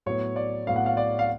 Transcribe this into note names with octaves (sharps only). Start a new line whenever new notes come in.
A2 F#3 B3 C#5
D5
A2 F#3 B3 F5
F#5
F5
D5
F5